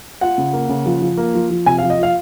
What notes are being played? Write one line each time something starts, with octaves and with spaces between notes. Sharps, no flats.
F4 F#5
C#3
A#3
C#3
F3
F3
A#3
F3
F3
C3 G#5
F5
F3
D#5
F4 F5